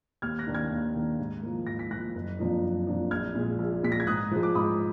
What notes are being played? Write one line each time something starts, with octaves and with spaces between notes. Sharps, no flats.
D#2 F6 G#6
F#6 A#6
D#3 A#3 D4
F6 G#6
D#2
D#3 A#3 D4
G#2
F3 A#3
G#2 A#6
B6
F3 A#3 F#6 A#6
F#1
F2 F3 A#3 D4
F#1
F2 F3 A#3 D4
A#1 F6 G#6
A#2 G#3
A#1
A#2 G#3 B6
A#6
G#6
G#2 D#6 F#6
F3 G#3
D6
G#2 B5 D#6